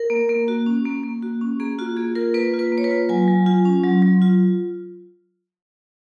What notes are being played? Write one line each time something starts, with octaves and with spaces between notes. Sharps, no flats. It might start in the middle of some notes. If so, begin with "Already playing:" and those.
Already playing: A#4
A#3
A#3
F#4
C#4
A#3
A#3
F#4
C#4
A#3 G#4
F4 F#4
A#3 G#4
F4 A#4
A#3 B4
F4
B4
A#3
C#5
B4
F4
F#3 G#5
F#3
F4
C#4
F#3
F#3
F4